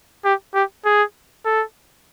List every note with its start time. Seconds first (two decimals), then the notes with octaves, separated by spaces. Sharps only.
0.25 G4
0.54 G4
0.85 G#4
1.45 A4